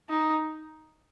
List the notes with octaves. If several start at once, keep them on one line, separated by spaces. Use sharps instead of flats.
D#4